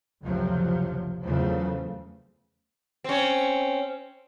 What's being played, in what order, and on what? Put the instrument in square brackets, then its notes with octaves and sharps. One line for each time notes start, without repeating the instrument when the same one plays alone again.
[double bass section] F#1 D2 C3 F3 F#3
E2 C#3 F3 F#3 A3
[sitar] C4 C#4